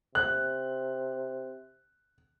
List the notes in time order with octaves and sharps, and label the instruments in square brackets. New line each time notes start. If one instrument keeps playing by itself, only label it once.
[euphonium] C3 [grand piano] F#6